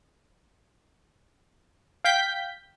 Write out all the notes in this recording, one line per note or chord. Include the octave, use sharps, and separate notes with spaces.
F5 G5 G6 B6